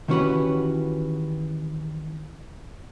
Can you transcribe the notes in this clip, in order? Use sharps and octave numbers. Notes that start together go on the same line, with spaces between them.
D#3 E3 C#4 F#4 G4 B4